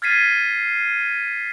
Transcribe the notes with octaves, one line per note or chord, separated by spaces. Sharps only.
F6 G#6 A6 B6 C7 D#7